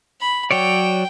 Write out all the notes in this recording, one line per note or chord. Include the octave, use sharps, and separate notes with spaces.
B5
F#3 C#5 D5 G5